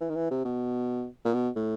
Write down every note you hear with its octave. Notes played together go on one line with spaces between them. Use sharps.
E3
D#3
E3
C3
B2
A#2
B2
A2